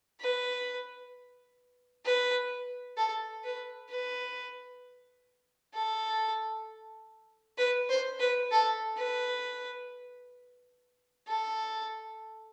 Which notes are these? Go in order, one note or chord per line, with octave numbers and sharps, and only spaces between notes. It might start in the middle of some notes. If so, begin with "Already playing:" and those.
B4
B4
A4
B4
B4
A4
B4
C5
B4
A4
B4
A4